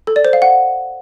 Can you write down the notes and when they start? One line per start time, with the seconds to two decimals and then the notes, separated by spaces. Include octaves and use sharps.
0.07 A4
0.16 D5
0.25 C5
0.33 F5
0.42 F#5